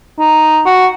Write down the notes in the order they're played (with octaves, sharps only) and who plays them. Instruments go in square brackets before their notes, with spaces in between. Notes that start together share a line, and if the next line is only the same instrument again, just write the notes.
[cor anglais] D#4
F#4